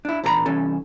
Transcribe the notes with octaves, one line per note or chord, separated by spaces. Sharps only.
D4 E4
E2 A#2 D4 B4 A#5 B5
C2 E3 C#4 A4